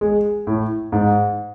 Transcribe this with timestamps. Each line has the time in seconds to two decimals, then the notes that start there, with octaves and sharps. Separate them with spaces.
0.01 G#3
0.47 A2
0.92 G#2